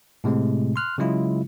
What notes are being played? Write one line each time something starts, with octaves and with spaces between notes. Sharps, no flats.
A2 C3 G#3 A3 C4
C6 F6 F#6
C#3 F#3 G#3 E4 F4